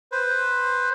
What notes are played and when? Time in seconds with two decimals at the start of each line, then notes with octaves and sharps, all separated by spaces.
0.12 B4 C5